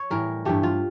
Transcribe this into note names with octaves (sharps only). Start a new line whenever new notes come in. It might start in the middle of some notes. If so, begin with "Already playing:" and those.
Already playing: C#5
A2 E3 G3 A#4
G2 E3 A3 G4
F4